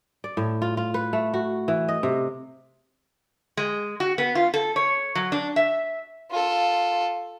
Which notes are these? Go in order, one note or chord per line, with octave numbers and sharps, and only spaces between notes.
D5
A2
F4
F4
B4
A3
F#4
E3
D#5
C3
G#3
F#4
B3
F4
A4
C#5
F#3
D4
E5
F4 A4